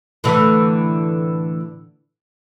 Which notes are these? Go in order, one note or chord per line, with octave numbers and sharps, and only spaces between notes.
A2 D3 E3